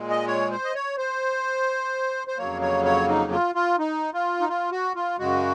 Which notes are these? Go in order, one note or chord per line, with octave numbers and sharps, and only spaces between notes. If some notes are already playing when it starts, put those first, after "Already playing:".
Already playing: A#2 G#3
D#5
C#5
C5
D#5
C#5
C5
C5
F2 C#3 F#3 A#3 C#5
C#5
C#5
D#4
F4
F4
D#4
F4
D#4
F4
F#4
F4
F#2 C#3 G#3 F#4